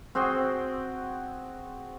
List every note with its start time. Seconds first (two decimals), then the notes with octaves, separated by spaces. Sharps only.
0.15 C4 F#4 G#4 G5